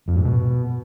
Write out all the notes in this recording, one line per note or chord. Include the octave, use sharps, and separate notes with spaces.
F2
G#2
B2